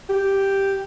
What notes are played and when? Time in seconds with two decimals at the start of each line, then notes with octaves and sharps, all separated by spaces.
0.09 G4